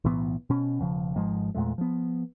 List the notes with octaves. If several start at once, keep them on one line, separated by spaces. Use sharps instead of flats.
B1 A2 E3 B3
B2 C#4
E1 C#3 F3
G#1 G#2 F3 G#3
E2 A#2 G#3 A3
F3 B3